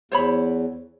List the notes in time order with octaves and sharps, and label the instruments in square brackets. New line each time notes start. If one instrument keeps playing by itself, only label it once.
[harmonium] E2 [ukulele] C5 C#5 B5